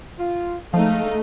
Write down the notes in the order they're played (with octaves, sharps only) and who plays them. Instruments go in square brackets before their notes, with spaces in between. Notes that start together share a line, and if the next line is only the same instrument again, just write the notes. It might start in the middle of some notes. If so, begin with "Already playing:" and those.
[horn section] F4
[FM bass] F3 [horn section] G#3 F5 [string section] A3 D#4